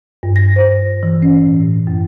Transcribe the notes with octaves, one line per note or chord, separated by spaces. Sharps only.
G2
A#6
C5
E3
C#4
A2
F#2